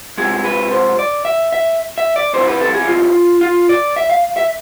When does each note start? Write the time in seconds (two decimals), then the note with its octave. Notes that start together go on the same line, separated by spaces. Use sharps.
0.18 C3 F3 G#3 G#4
0.44 B4
0.72 C5
0.99 D5
1.25 E5
1.52 E5
1.98 E5
2.16 D5
2.33 E2 C3 E3 C5
2.48 B4
2.61 A4
2.74 G#4
2.87 F4
3.41 F4
3.69 D5
3.96 E5
4.10 F5
4.37 E5